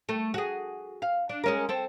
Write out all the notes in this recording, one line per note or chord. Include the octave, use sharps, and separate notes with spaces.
A3
F#4 G#4
F5
D4
G#3 C#4 A#4
C4 A4